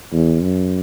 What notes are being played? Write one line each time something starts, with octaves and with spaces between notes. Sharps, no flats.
E2
F#2